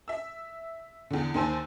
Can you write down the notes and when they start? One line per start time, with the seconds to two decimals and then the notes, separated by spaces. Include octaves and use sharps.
0.08 E5 E6
1.11 E2 D3
1.34 D#2 D#3 C5 G#5 A5 E6